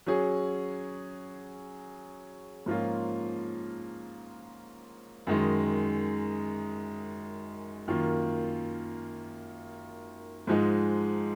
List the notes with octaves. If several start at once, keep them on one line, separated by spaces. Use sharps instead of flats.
F#3 C#4 G#4
G#2 F3 A#3 C#4 F4
F#2 D#3 G#3 D#4
F#2 D#3 A#3 F4
G#2 F3 G#3 D#4